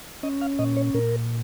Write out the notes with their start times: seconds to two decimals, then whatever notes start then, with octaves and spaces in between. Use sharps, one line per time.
0.23 C#4 D#5
0.41 F5
0.59 A#2 D#5
0.77 C#5
0.94 A#2 A#4